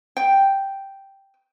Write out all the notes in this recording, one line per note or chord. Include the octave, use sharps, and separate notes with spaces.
G5